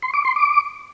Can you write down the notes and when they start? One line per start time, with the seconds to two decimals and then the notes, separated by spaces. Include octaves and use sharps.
0.02 C6
0.14 D6
0.25 C6
0.36 D6